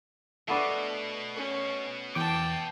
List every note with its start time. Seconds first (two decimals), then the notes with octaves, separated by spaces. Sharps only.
0.48 B2 A3 B3 D4
1.36 C#4
2.15 E2 G5 A5 D6